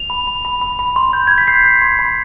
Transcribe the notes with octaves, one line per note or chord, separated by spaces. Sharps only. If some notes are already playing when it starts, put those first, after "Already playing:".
Already playing: F7
B5
B5
B5
B5
B5
C6
G6
G6 G#6
B6
G6 C7
G6
C6
B5